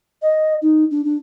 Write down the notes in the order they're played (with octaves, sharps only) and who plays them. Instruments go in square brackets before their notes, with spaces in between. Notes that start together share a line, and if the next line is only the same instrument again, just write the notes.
[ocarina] D#5
D#4
D4
D4